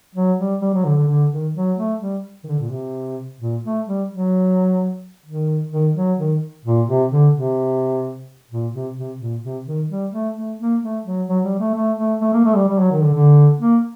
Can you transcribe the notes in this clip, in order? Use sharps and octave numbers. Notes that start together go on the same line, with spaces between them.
F#3
G3
G3
F#3
D3
D3
D3
D#3
F#3
A3
G3
D#3
D3
A#2
C3
A#2
A3
G3
F#3
D#3
D#3
F#3
D#3
A#2
C3
D3
C3
A#2
C3
C3
A#2
C3
D#3
G3
A3
A3
A#3
A3
F#3
F#3
G3
A3
A3
A3
A3
A#3
A3
G3
G3
F#3
D#3
D3
D3
A#3